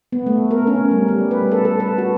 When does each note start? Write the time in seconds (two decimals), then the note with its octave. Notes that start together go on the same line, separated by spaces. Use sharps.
0.12 B3
0.26 A3
0.51 A#4
0.67 C#4
0.91 G3
1.08 G3
1.31 B4
1.52 A4
1.65 A4
1.80 B4
1.98 F#4